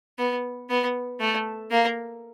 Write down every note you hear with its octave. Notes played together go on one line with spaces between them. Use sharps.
B3
B3
A3
A#3